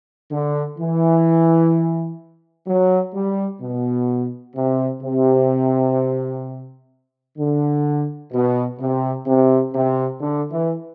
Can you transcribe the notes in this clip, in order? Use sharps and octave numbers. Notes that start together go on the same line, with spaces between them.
D3
E3
F#3
G3
B2
C3
C3
D3
B2
C3
C3
C3
D3
E3